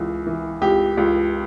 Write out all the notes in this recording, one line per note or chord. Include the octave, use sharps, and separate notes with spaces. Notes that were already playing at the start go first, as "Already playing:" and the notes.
Already playing: C#2 E3
E3
C#2 G4
C#2